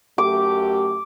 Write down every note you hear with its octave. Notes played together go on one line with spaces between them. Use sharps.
F#2 A3 G4 D6